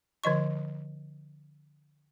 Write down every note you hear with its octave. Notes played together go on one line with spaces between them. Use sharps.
D3 F3 D#5 C#6